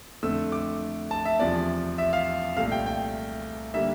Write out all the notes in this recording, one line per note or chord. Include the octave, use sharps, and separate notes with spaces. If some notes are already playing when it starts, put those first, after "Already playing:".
F2 D3 A3 C4 E6
D6
A5
E5
E2 C3 F3 D5
E5
F5
C2 A#2 A3 F5
G5
G5
D3 G3 A#3 E5